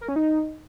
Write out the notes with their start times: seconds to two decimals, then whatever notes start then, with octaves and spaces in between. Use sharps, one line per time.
0.01 A#4
0.08 C#4
0.16 D#4